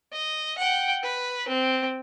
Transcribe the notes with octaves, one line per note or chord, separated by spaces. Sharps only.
D#5
F#5 G5
B4
C4